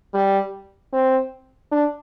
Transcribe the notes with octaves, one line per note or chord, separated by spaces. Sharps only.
G3
C4
D4